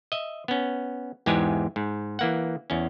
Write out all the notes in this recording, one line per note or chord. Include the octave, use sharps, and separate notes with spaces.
D#5 E5
B3 C#4
E2 G#2 E3 G#3 G4 G#5
G#2
E3 A#3 F#5
E2 C#4